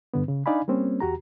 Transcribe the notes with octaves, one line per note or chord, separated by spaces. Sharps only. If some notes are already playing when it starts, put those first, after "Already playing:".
G2 D3 B3
C#3
D4 D#4 D5 F5 G#5 B5
G3 A#3 C4 C#4
E2 F#4 G4 A#5